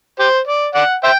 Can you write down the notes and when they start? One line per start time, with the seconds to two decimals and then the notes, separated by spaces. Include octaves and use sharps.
0.19 G4 C5
0.47 D5
0.75 D5 F#5
1.04 C5 E5 G5